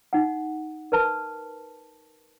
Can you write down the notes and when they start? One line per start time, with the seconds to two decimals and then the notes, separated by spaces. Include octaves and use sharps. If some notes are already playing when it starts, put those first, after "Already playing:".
0.13 D#4 F#5
0.92 A#4 B4 A5